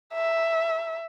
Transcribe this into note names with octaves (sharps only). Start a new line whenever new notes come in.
E5